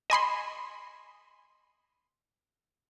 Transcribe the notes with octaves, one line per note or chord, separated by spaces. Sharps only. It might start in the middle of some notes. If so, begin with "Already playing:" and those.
D#5 G#5 B5 C6